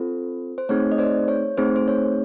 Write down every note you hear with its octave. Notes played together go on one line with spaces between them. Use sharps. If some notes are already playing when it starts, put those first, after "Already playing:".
Already playing: C4 F4 A4 C5
C5
A3 C4 D#4 G#4 C#5
D#5
C5 D5
C#5
A3 C4 D#4 G#4 C5
C5
C#5